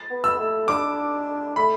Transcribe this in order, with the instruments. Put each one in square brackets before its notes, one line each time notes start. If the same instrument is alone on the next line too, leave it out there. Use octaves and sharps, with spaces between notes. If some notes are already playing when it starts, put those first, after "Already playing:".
Already playing: [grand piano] A6
[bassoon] B3
[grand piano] E6
[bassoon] A3
[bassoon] D4 [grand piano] D6
[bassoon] A3 [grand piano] B5